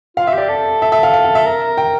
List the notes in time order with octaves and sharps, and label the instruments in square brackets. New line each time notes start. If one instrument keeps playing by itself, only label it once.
[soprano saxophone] F4 [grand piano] F5
[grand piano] E5
[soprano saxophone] G4 [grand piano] D5
[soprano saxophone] A4
[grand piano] E5
E5
F5
F5
F5
E5
[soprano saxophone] A#4
[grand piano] G5